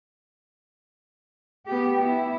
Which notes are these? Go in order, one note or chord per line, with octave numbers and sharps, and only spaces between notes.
B3 G4
E4